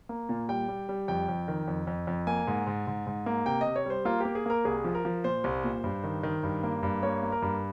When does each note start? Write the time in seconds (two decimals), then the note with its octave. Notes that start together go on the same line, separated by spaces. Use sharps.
0.09 A#3
0.29 A#2
0.49 G3 G5
0.68 G3
0.89 G3
1.08 F2 G5
1.28 F2
1.48 D#3
1.68 F2
1.87 F2
2.07 F2
2.27 A#3 G#5
2.47 G#2
2.66 G#2
2.87 G#2
3.06 G#2
3.26 A#3
3.46 C3 G5
3.61 D#5
3.66 C3
3.76 C#5
3.86 G3 C5
4.05 A#3 F4
4.20 A#3 G4
4.35 G#4
4.46 A#3 A#4
4.65 C2 G#4
4.84 F3
4.95 A#4
5.05 F3
5.24 A#2 C5
5.44 C2
5.64 A#2
5.84 G2
6.04 D#3
6.23 D#3
6.43 G2
6.63 A#3
6.83 G2
7.03 A#3 C#5
7.23 A#3
7.32 A#4
7.42 G2